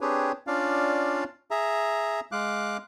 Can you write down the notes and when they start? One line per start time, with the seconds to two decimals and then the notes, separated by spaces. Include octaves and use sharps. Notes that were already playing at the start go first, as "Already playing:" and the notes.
0.01 C4 D4 G4 G#4 B4 C#5
0.47 C#4 D4 F4 D5 F5
1.51 G#4 E5 A#5
2.32 G#3 F5 D6 F#6